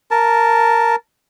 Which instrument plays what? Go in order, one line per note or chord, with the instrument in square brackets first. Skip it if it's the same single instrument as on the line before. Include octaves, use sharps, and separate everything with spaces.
[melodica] A#4 A5